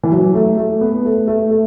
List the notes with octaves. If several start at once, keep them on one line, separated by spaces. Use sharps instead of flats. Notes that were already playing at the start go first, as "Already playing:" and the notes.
E3
F#3
A3
A3
B3
A3
A3
A3